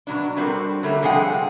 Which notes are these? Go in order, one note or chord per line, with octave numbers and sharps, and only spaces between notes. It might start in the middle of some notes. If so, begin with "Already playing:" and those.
B2 F#3 D4
F#3 G3 C4 F#4 A4 A#4
D3 F#3 G3 A3 A#3
G2 C3 F3 G#4 F#5 G5